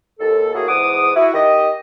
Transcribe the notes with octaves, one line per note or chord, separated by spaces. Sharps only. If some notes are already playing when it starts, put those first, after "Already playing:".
D#2 A4
A2 A#3 E4 F#4 G#4
E2 G#2 F#5 D6 D#6
E4 F#4
D#3 G4 D#5